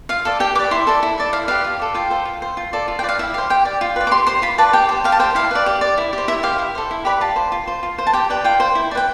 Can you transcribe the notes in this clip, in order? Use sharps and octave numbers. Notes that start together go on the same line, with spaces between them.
F4 F5
A4 D5
G4 G5
B4 D5 D6
E4 C6
A4 D5
E4
A4 D5
E4 F5
G4 B4 F5
F4
A4 D5
F4 G5
A4 C5
F4
C5
F4
A4 D5
F4
G5
B4 D5
F5
E4 E5
G4 C5 F5
G4 G5
D5
F4
B4 D5
D6
G4 C6
C5 C6
F4 B5
B4 D5 A5
G4 G5
C5
G4 F5
A5
C5 G5
E4 F5
B4 D5
G4
D5
E4
G4 C5
E4 E5
G4 C5 F5
E4
A4 C5
E4
G4 B4 D5 B5
F4 A5
C5
F4
C5
F4
C5
A5
G4 G5
B4 D5 G5
F4 G5
C5
E4
D5
B4 G5